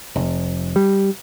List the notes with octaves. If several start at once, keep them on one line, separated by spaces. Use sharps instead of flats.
F1
G3